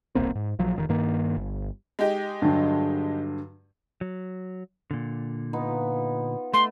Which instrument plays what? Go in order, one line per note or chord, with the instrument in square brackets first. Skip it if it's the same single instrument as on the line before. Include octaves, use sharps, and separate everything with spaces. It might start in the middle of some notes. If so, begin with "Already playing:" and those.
[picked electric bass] D#1 B1 A#3 C4
G#2
A#1 F3 F#3
F1 A#2 D#3
G2 D#3 A#3
G1
[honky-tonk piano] G#3 D#4 G4
[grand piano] G2 D3 F#3
[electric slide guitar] F#3
A#2 D3
[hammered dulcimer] B3 D#4 F4
[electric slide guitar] A3 [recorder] C6